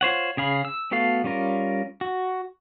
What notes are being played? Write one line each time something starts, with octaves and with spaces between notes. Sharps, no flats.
F4 C5 C#5 F#5
C#3 G#4 F5 B5
E6
A3 B3 F#4 A4 F5
G3 C#4 F4 A#4
F#4